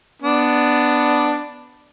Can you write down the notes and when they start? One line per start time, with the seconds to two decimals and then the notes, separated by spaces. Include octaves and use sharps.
0.22 B3 D4